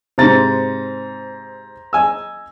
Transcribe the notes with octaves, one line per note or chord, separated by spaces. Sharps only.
G#2 C3 C5 A#5 A6
D#5 G#5 E6